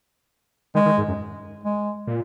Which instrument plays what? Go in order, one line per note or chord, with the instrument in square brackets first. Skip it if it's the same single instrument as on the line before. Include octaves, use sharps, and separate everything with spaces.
[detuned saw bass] D#3 [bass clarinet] G#3
[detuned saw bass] D#3
G#2
F#2
[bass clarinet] G#3
[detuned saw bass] A#2